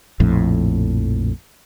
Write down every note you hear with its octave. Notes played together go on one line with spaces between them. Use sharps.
A#1 F2 A2